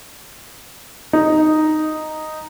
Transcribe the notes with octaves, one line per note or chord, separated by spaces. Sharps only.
D#4